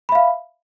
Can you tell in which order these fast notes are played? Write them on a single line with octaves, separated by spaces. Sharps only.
B5 E5 F5